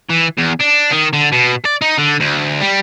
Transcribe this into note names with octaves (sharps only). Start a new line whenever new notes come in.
E3
E2
D4
D#3
D3
B2
D5
D#4
D3
D2
G3